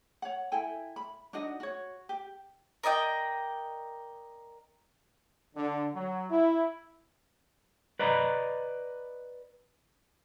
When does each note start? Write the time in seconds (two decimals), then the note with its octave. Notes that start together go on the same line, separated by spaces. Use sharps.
0.22 C#5 F#5
0.52 E4 A4 G5 G#5
0.96 B5
1.33 D4 D#4 F#4 D#5
1.60 F#4 C#5
2.09 G4
2.83 A#4 D5 D#5 G5
5.55 D3
5.95 F#3
6.30 E4
7.99 B4 D5 D#5 A#5 B5